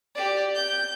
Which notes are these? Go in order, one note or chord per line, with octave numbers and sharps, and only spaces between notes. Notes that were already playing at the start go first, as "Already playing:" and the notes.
G4 D5
G6